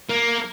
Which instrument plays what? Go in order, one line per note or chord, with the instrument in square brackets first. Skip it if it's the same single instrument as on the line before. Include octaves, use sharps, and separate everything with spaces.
[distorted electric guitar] A#3